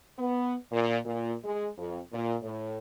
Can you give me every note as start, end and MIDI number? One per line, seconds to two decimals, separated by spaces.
0.19 0.55 59
0.71 0.98 46
1.05 1.33 46
1.44 1.68 56
1.78 1.99 41
2.12 2.36 46
2.42 2.78 45